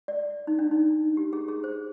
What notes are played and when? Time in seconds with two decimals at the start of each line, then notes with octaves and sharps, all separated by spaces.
0.08 D5
0.47 D#4
0.59 D4
0.71 D#4
1.17 G4
1.33 G#4
1.48 G#4
1.64 C5